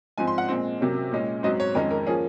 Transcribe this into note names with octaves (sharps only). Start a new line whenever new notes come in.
G#2 F3 C4 G#5
C6
F#5
A#2 G#3 C4
C3 F#3 A#3 C#4
A#2 G#3 C#4
G#2 F#3 C4 D#5
C#5
F2 D#3 G#3 C#4 A#4
A#4
F3 A#3 C#4 G#4